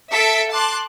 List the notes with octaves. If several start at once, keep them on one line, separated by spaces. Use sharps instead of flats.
A4 E5 B6 D7
A5 C6 D6 F#6